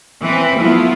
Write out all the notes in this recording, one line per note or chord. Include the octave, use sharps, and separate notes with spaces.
E3 C4 B4
F3 F#3 A3 B3 E4 F4